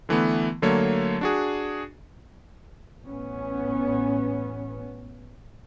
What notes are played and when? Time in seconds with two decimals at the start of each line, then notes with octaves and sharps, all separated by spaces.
0.09 D3 E3 A3 B3
0.62 D3 F#3 A3 A#3 C#5
1.21 D4 F#4 G#4
3.02 A1 B3 C#4